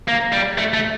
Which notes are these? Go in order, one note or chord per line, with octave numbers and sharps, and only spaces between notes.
A#3
G3
A3
A3